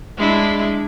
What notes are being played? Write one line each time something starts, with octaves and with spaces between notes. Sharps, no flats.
G#3 D4 E4